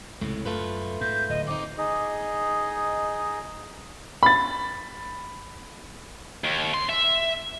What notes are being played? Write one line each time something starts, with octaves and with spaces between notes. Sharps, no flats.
C#2 A2 C3 G#3
F#2 A3 F4 B4
G#2 G6
D1 D#5
C4 D#4 D6
D#4 G#4 D#5
B5 A6
D#2
C6
E5